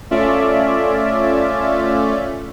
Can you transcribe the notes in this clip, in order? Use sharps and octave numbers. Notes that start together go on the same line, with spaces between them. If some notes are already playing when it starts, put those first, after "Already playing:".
A3 C#4 F4 D5 E5